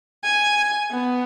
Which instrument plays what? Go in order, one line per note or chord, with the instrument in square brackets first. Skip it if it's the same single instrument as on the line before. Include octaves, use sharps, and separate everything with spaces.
[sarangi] G#5
B3